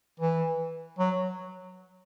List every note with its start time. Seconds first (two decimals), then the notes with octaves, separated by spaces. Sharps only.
0.20 E3
0.99 F#3